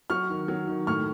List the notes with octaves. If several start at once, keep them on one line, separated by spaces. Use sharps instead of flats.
F#3 C#6 F6
D#3
F#3
D#3
A2 C#6 F6